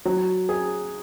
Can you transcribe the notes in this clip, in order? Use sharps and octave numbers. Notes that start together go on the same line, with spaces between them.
F#3
G#4